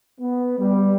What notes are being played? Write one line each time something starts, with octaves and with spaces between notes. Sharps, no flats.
B3
G3